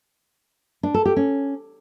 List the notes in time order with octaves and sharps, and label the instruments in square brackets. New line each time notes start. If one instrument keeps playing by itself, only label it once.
[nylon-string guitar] D4
A4
G4
C#4